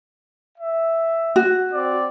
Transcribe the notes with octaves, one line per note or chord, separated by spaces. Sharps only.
E5
F#4
C4 D5